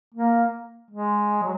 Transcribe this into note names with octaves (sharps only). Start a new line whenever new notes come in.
A#3
G#3
F#3